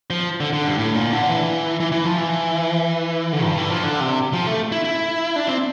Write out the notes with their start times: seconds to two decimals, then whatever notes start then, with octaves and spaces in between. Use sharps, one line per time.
0.10 F3
0.40 D3
0.53 D3
0.66 G2
0.78 A2
0.95 A#2
1.13 D3
1.29 E3
1.80 E3
1.92 E3
2.05 F3
2.18 E3
3.33 D3
3.44 G2
3.58 E3
3.70 F3
3.83 D3
4.00 C3
4.33 F3
4.46 A3
4.72 E4
4.84 E4
5.36 D4
5.48 C4